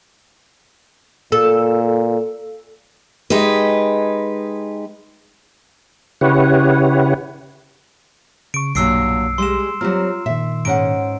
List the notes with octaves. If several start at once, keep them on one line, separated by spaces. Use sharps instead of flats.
A#2 A4
G#3 D#4 G4 B4
C#3 E4 G4 B4 C#5 F#5
C#3 C#6 D7
B1 G2 A#2 F#3 E6 C7 D7
G3 G#3 C6 E7
F#3 G3 C4 F4 A#5 F6
A#2 D#3 E5
G#2 C#4 F#5 D7